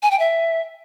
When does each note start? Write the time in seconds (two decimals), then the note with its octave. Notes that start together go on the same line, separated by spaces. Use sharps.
0.03 G#5
0.11 G5
0.19 E5